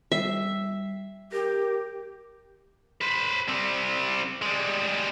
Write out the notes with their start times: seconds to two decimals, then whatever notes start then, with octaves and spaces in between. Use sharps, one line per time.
0.12 G3 E5
1.32 G4 A#4
3.01 B4 C5
3.49 G3 C4
4.42 G3 G#3